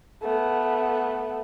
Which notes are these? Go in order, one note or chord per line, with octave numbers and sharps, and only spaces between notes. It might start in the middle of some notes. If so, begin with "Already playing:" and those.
A3 B3